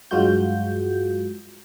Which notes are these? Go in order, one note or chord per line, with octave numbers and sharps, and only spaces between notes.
G2 F#3 G#3 F4 F#4 G6